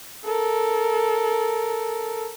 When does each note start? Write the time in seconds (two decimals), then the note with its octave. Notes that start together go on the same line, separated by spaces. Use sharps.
0.25 A4 A#4